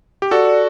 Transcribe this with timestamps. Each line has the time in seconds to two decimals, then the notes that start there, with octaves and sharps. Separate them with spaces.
0.22 G4
0.31 F#4 A4 D5